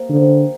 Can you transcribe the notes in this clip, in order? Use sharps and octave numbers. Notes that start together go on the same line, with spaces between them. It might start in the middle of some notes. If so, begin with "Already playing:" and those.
Already playing: C3 A#3
D3 F3 C4 D#4 A#4